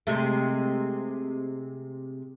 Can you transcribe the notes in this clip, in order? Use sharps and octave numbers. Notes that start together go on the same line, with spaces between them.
C3 G#3 A3